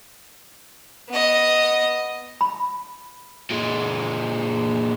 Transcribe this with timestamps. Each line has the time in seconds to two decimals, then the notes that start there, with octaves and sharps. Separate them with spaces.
1.09 B3 D#5
2.41 B5
3.51 A#2 G#3